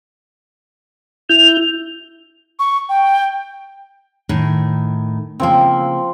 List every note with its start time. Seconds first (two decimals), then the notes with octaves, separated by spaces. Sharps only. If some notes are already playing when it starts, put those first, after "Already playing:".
1.29 E4 G6 F7
2.59 C#6
2.89 G5
4.29 A2 D#3
5.40 C#3 F3 A#3 C4